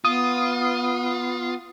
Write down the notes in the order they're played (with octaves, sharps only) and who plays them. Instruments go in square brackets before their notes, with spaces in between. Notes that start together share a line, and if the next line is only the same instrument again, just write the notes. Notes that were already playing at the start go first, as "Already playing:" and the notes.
[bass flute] B3 [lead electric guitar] F4 [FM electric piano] D#6